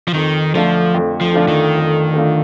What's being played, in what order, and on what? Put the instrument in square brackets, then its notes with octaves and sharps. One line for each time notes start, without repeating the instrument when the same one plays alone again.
[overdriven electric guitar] F3
[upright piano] F2 [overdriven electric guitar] D#3
[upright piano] D3 A3 D4 F4 [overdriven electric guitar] F3
[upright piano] F2
[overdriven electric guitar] F3
[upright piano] D3 A3 D4 F4
[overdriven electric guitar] D#3
[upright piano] F2
D3 A3 D4 F4